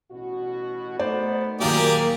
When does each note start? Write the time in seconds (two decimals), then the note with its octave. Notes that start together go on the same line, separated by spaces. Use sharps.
0.11 A1 B2 F#4
0.99 A3 B3 D#4 C5 D5
1.61 D#2 A#2 F#3 A#3 G4 G#4 D5